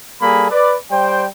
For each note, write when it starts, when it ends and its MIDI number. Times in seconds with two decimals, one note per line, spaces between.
0.21 0.50 55
0.21 0.50 58
0.21 0.50 68
0.21 0.50 69
0.21 0.50 83
0.51 0.75 71
0.51 0.75 74
0.91 1.25 55
0.91 1.25 72
0.91 1.25 79